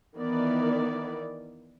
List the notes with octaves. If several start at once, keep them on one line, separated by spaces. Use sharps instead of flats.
D#3 E3 B3 E4 A#4 D5